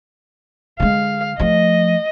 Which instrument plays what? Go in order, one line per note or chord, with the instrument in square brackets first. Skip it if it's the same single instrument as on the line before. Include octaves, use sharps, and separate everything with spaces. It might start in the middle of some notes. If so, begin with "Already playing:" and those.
[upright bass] D3 G#3 [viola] F5
[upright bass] F3 A3 [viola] D#5